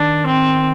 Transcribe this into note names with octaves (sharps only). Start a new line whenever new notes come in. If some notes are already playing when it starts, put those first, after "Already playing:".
Already playing: D#3 D4
C4